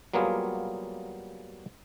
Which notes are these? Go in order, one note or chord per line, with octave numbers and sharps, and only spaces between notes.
F#3 G3 A#3 B3 F4 G#4